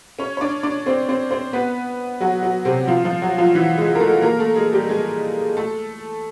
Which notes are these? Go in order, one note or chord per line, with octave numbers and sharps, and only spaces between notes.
C#4 C#5
C#5
D4 D5
D4 D5
C4 C5
C4 C5
C4 C5
B3 B4
F#3 F#4
F#3 F#4
C3 C4
F3 F4
F3 F4
F#3 F#4
F3 F4
E3 E4
G#3 G#4
A#4
A3 A4
A#3 A#4
A3 A4
G#3 G#4
G3 G4
G#3 G#4
A3 A4